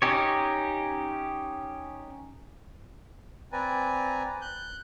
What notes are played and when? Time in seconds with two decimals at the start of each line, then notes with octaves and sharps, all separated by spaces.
0.02 C#4 D#4 G4 C#5
3.52 C4 B4 D5 G#5 A#5
4.41 F#6 G6